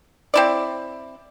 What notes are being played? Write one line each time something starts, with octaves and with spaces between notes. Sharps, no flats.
C4 E4 D5